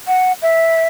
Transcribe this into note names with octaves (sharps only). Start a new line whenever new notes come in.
F#5
E5